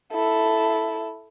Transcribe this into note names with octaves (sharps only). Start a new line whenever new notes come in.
E4 A4